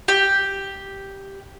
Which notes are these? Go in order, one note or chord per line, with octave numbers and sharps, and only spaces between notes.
G4